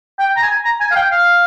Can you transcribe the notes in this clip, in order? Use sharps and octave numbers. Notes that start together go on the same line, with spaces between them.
G5
A#5
G#5
A#5
G#5
F5
G5
F5